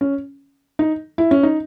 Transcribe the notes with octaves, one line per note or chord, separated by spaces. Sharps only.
C#4
D#4
E4
C#4
D#4